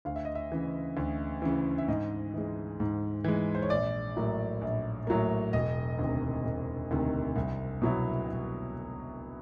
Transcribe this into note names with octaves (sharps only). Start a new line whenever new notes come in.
D2 F5
E5
D#5
E5
C#3 E3
D2
C#3 E3
E5
G#2 D#5
E3 G#3
G#2
E3 G#3
C5
C#5
A#1 D5
A2 F#3 A#3
A#1
A2 F#3 A#3
E1 D#5
D2 C3 D#3
E1
D2 C3 D#3
C2
B2 F#3 B3 E4
C2